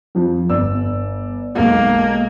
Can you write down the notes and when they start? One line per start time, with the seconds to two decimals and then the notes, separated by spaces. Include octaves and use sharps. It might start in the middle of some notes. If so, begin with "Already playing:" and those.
0.15 F2 F3
0.49 G1 D5 E6
1.55 B1 G#3 A#3